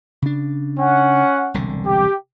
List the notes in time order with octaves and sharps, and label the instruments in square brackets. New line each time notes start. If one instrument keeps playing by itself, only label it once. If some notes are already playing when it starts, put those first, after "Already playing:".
[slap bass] C#3 D4
[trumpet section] C#4 F#5
[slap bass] E1 C2 D3
[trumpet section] G4